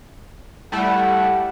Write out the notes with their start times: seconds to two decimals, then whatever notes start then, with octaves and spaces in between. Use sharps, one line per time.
0.72 G3 A3 E4 F#5